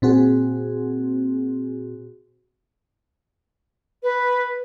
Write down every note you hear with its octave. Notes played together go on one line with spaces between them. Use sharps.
A#2 C4 F#4 G#4
B4